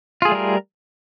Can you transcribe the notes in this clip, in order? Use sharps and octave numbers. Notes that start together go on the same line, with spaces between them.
G3 A3 F4 G#4 A#4